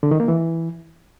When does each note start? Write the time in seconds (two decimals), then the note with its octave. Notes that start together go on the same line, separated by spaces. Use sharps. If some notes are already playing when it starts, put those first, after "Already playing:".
0.03 D3
0.11 D#3
0.20 A#3
0.28 E3